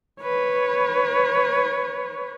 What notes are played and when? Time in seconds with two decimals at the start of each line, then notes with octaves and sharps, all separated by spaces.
0.22 B4 C#5